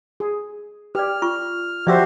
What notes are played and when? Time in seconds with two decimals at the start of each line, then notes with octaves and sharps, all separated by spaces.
0.20 G#4
0.95 G4 B4 D5 F6
1.22 F4 C#6
1.87 F3 F#4 G4 C5 D5 E5 E6